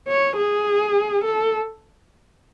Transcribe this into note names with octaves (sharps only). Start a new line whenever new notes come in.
C#5
G#4
A4